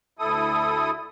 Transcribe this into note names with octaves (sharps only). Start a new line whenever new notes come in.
D2 E4 A4 D#6